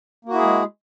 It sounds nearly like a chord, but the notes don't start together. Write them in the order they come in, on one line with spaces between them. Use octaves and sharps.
A#3 F#4 E4 G#4 G#3